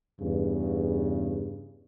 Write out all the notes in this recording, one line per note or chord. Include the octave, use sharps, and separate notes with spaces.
E2 G2 C#3